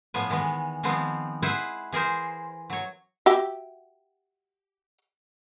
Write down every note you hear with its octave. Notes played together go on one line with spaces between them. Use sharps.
A2 F3 B3 G#5
D#3 E3 G#3 B3
D#3 F3 G#3 B3 C4
E4 G#4 B4 C5 E5 F#5
E3 G#4 A#4 C5
F#3 C#5
F#4 G4 E5